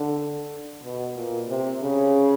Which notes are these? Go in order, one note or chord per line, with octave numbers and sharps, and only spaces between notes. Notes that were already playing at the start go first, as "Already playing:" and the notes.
Already playing: D3
B2
A#2
C3
C#3